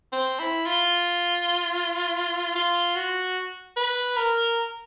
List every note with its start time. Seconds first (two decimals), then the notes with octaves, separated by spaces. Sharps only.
0.12 C4
0.39 E4
0.66 F4
2.55 F4
2.96 F#4
3.77 B4
4.16 A#4